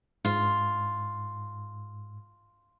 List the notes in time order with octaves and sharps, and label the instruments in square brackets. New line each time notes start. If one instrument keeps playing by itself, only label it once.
[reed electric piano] G#2 [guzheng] F4